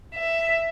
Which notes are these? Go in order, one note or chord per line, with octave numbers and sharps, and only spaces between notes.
E5